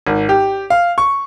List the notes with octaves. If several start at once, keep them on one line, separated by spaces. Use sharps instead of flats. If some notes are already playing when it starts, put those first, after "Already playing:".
G#1
G4
F5
C#6